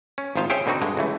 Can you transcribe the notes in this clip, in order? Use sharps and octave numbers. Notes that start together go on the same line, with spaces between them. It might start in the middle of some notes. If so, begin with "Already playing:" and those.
C#4
G#1 D#3 F3 F4 C5 F5
C#4 G#4 C5 C#5 E5 G5
B2 D3 C4 D#4 F#4
G2 D3 G#3
C#2 E3 A3